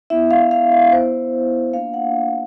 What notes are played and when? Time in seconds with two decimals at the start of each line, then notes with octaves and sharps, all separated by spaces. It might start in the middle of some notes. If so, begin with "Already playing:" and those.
0.10 B3 E4 E5
0.31 F5
0.51 F5
0.72 E5
0.91 B3 E4 C5
1.73 A#3 D4 F4 F5
1.94 F#5